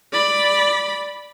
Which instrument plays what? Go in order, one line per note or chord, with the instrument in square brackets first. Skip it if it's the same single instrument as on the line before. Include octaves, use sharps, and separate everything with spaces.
[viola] D5 B5